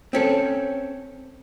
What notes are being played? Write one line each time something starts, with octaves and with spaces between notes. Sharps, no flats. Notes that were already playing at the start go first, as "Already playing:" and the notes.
C4 C#4 A4